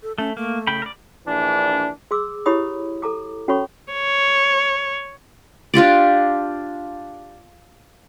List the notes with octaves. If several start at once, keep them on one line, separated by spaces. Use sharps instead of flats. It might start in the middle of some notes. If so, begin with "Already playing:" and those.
A4
A3 C#4
A3 A#3
C#3 G5 B5
A#4 D5
A#1 E3 D4
G#4 C6 D6 E6
E4 G4 C#5 B5 D#6
A4 A#5 D6
C#4 F#4 A4 C#5 B5 C#6
C#5
D4 F4 G4 D5